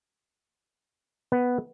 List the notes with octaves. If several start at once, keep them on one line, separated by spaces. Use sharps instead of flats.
B3